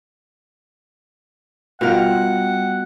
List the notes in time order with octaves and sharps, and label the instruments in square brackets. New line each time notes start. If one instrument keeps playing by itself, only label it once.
[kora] B2 A#4 [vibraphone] G3 [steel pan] F4 G5 [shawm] F#5